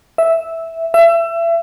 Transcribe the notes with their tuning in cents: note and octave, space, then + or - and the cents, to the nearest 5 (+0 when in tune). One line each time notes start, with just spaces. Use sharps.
E5 -5
E5 +30